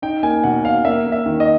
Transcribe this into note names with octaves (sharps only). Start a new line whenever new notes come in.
D#4 G5
A#3 G#5
B2 F#5
B2 F5
A#3 E5
A#3
E5
D#3
D#5